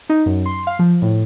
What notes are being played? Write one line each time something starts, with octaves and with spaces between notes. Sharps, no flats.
D#4
F#2
C6
F5
F3
A2